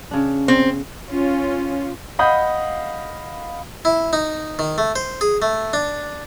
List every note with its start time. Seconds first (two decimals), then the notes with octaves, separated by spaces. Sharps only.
0.11 C#3 D4
0.48 C4
1.08 C#4 F4
2.19 D#5 F5 F#5 B5 D#6 G6
3.85 E4
4.13 D#4
4.59 D#3
4.78 A3
4.96 C5
5.21 G#4
5.42 A3
5.73 D4